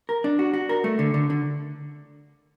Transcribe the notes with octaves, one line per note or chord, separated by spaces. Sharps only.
A#4
D4
F#4
F#4
A#4
A3
D3
D3
D3